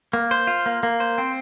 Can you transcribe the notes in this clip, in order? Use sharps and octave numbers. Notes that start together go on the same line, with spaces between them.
A#3
C5
F4
A#3
A#3
C5
C4